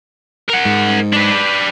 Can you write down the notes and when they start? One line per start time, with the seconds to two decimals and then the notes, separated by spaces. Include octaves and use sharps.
0.49 A#4 F#5
0.65 G#2
1.13 D4 B4